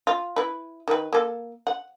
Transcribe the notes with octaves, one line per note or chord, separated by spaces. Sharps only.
F4
E4 B4
D#3 B4
A#3 A4
F#5